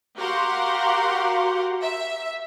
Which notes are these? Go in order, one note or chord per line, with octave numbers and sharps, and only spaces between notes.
F#4 G4 A#4 F5 F#5 C6
E5